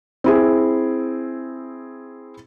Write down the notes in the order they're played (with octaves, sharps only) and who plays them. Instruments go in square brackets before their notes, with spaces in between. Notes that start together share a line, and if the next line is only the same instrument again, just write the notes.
[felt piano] C4 E4 G#4